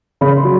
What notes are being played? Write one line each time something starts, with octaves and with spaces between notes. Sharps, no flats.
C#3 B5
C6
F#3